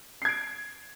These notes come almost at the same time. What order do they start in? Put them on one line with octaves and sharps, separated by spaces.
C7 G#6 D7